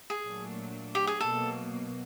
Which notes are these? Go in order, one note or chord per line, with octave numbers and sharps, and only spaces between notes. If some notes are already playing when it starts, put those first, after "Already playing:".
G#4
A#2 F#3 A3 D4
G4
G#4
B2 F#3 A#3 A4